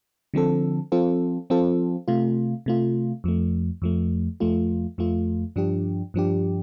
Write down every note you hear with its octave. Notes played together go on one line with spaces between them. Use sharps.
D3 F3 C4 A4
F3 C4 F4 A4
F3 C4 F4 A4
C3 A3 F4
C3 A3 F4
F2 F3 A3
F2 F3 A3
F2 F3 A3 F4
F2 F3 A3 F4
G2 F3 D4 G4
G2 F3 D4 G4